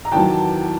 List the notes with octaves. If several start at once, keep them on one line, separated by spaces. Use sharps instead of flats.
A#5
E2 C3 D#3 F#3 G5 A5